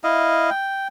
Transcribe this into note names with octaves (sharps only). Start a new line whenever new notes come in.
E4 D#5 F5
G5